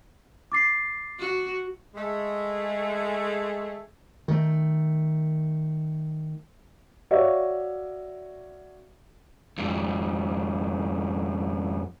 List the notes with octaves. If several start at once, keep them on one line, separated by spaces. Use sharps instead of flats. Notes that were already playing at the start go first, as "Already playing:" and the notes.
D6 A6 C7
F#4
G#3 A3 G#4
D#3 A3
F#4 C#5 D5 E5 F5
F2 G#2